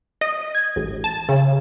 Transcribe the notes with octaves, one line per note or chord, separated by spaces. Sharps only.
D#5
G#6
A1
A5
C#3